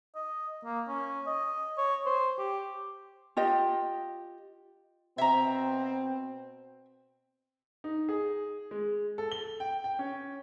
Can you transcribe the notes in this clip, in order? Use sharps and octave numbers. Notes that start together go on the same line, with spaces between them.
D#5
A#3
C#4
D#5
C#5
C5
G4
F4 G4 D#5
B2 C4 E5 A#5
D#4
G#4
G#3
A4
G7
G5
G5
C#4